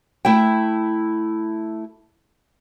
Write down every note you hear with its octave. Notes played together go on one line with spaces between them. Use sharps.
A3 E4 E5 G5